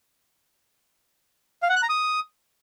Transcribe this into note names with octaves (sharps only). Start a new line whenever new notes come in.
F5
F#5
F#6
A#5
D#6